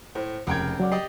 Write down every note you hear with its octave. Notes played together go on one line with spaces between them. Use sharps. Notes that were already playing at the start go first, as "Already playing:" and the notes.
A2 C5
F1 C#2 A#4 G5 G#6
F#3 D5 F#5 D6
G4 D5 D#5 C7